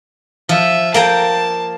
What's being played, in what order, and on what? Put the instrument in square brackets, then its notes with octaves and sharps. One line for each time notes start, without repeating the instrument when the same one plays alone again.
[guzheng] F3 [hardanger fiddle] E5
[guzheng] A#3 G5 A#5 [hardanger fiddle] A5